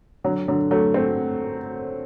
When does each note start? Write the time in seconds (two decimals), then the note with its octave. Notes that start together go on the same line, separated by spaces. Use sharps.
0.24 D3 F#3
0.48 D3 F#3
0.71 F#3 A3
0.94 A3 C4